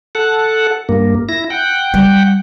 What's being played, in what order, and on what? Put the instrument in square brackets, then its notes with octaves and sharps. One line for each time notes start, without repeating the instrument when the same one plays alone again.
[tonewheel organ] A4 F#5
G2 A#3
E4 A#6
F#5 G5
[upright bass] G3